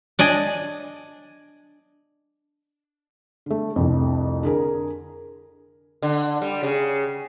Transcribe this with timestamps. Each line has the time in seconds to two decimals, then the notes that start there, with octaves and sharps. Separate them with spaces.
0.19 D4 D5 D#5 G#5
3.46 D3 A3
3.76 F1 C2 F2
4.43 D3 G#4 A#4
6.02 D3
6.42 G3
6.63 C#3